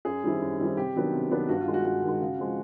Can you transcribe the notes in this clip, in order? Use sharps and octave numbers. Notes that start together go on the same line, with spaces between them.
F#2 G#4
D#3 G3 C4 E4
F#2
D#3 G3 C4 E4
C3 G4
D#3 F#3 B3 D4
C3
D#3 F#3 B3 D4
G2 F#4
F4
D#3 G#3
F#4
G2 F#4
D#3
G#3
C#3
F3 G#3 C4